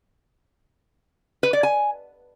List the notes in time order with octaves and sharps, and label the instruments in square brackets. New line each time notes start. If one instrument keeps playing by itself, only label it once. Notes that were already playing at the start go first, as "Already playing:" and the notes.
[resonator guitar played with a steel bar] B4
D5
G#5